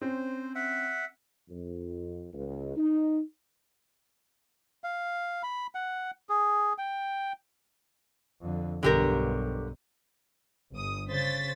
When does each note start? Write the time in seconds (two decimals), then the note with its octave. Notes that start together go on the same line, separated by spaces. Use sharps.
0.01 C4 C#4 C5
0.55 E5 F#5
1.49 F2
2.33 C#2
2.77 D#4
4.84 F5
5.43 B5
5.75 F#5
6.29 G#4
6.78 G5
8.41 F2 D3
8.83 B1 G2 D3 G4 A#4
10.73 G1 D#6
11.10 C#3 C5 A6 B6